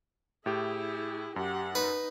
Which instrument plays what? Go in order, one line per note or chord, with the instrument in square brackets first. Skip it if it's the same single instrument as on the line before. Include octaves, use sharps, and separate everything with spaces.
[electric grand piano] A2 G4 [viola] E4 G#4
[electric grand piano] F#2 [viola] G4 F#5
[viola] D#4 [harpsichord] B4